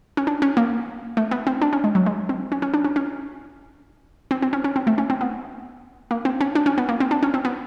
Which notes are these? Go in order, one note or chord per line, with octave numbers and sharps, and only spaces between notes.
C#4
D4
C#4
A#3
A3
B3
C4
D4
C#4
G#3
F#3
G#3
C4
C#4
C#4
D4
C#4
C#4
C4
C4
C#4
C#4
C4
A3
C#4
C4
B3
A#3
C4
C#4
D4
C#4
B3
A#3
C4
D4
C#4
C4
B3